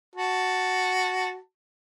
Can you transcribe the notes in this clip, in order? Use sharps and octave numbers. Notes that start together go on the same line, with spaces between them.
F#4 A5